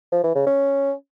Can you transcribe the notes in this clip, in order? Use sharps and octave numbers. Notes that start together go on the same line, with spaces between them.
F3
E3
C#3
C#4